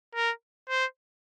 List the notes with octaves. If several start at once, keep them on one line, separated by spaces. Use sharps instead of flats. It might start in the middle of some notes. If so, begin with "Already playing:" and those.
A#4
C5